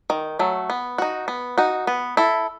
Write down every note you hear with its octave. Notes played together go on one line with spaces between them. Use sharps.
D#3
F#3 A3
B3
D#4 F#4
B3
D#4 F#4
B3
E4 A4